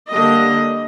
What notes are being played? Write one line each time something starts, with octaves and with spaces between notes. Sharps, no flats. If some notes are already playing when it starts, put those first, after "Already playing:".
D3 G3 A#3 D4 D#5